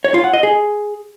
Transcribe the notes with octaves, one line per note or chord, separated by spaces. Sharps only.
C#5
F4
F#5
D#5
G#4